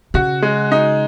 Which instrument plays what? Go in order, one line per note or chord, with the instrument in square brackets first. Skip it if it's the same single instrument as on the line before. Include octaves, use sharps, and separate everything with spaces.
[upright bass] C#3 [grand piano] F#4
[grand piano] G#3
D#4